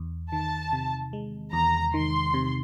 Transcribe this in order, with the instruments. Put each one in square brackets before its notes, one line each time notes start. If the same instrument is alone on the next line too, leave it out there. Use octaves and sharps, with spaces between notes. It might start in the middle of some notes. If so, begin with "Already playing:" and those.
Already playing: [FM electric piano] E2
[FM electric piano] D#3 [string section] A5
[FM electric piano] C3
G#3
[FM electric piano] E2 [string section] A#5
[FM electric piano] D#3 [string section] C6
[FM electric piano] C3